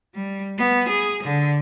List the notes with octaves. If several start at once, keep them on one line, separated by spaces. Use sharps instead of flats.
G3
B3
G#4
D3